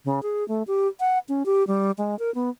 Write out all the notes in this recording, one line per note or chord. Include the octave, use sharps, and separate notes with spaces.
C#3
G#4
A3
G4
F#5
C#4
G4
G3
G#3
A#4
B3